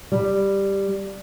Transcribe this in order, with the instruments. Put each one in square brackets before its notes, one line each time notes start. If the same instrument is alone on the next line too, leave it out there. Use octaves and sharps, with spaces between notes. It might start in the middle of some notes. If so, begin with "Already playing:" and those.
[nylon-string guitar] G3